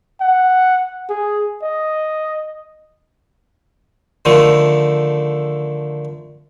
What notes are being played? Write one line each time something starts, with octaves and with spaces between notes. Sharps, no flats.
F#5
G#4
D#5
D3 D#3 F3 A3